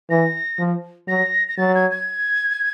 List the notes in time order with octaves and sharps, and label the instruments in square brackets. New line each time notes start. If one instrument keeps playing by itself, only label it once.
[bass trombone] E3 [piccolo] A#6
[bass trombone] F3
[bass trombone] F#3 [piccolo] A#6
[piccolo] A#6
[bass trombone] F#3 [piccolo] A6
[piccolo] G#6
G#6